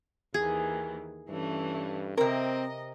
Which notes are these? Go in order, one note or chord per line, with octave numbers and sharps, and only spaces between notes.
D#2 D#3 E3 G#4
G2 E3 A3 C#4
C3 C4 A#4 D#5